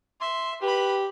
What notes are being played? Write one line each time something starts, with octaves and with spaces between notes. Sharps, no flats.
E5 C6
G4 B4 B5